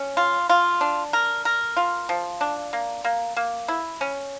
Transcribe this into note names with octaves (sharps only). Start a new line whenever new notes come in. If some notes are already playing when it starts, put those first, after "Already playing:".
Already playing: C#4
F4
F4
D4
A#4
A#4
F4
F3
D4
A#3
A#3
A#3
E4
C#4